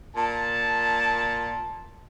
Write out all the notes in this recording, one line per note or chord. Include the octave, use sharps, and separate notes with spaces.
A#2 A5